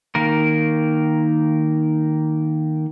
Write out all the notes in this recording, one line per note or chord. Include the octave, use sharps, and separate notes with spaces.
D#3 A#3 A#4